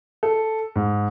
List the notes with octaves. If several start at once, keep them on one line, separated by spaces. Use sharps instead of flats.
A4
G#2